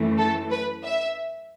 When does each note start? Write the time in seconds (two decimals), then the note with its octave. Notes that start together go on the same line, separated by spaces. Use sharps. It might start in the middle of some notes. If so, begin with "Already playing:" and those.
Already playing: F#2 E3 A3
0.18 A4
0.51 B4
0.84 E5